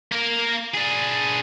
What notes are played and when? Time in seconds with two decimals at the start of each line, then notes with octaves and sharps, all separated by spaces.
0.12 A#3 A#4
0.74 D4 G#4